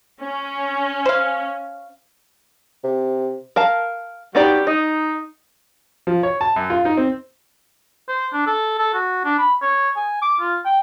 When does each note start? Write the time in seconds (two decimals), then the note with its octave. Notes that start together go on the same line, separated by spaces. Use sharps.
0.20 C#4
1.05 C5 F5
2.84 C3
3.56 A#4 F5 A5
4.35 F#3 G3 B3 D#4 G4 D5
4.67 D#4 D#5
6.07 F3
6.23 C#5
6.41 A5
6.56 F#2
6.70 F4
6.85 D#4
6.97 C4
8.08 C5
8.33 D4
8.46 A4
8.79 A4
8.94 F#4
9.25 D4
9.39 B5
9.62 C#5
9.97 G#5
10.22 D6
10.40 F4
10.65 G5